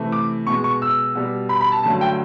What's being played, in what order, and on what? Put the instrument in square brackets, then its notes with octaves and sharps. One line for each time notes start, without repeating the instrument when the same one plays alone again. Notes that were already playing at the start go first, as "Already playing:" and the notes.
Already playing: [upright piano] C3 E3 A3
D6
B2 G#3 C#6
C#6
E6
B2 G3
B5
B5
A5
G2 D3 F#3 A3 A5
G5